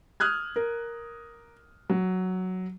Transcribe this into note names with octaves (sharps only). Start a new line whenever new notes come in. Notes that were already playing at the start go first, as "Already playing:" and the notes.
D#6 F6 F#6 G#6
A#4
F#3